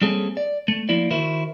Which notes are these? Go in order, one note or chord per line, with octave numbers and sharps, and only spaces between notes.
G3 A#3 C4 C#4 G#4 A4
D5
A3
F3 A#3 E4 D5
D#3 E4 F#4 A#4 C5